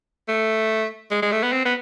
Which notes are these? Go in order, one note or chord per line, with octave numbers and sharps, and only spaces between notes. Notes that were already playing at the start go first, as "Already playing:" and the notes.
A3
G#3
G#3
A3
B3
C4
B3